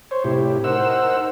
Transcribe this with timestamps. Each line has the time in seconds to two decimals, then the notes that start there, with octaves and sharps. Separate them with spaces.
0.11 C5 C#5
0.24 A2 C3 E4 G4
0.64 D#4 A#4 C5 F#5 E6